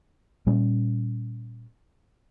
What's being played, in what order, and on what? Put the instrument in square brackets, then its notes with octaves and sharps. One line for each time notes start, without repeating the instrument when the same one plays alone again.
[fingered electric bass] A#2 G3 C#4